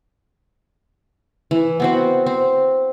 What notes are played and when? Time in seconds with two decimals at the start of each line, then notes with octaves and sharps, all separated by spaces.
1.51 E3
1.80 B3 C4 F#4
2.26 C4